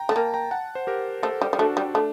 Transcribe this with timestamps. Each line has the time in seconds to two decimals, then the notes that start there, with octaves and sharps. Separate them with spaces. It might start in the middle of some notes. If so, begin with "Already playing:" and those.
Already playing: G5 A#5
0.09 A3 A5
0.16 A#3 G5 A#5
0.34 G5 A#5
0.51 F#5 A5
0.75 C5
0.87 G4 A#4
1.23 A3 A4 C5
1.41 G3
1.53 G3
1.58 A3 D4 F#4
1.77 G3
1.95 A3 D4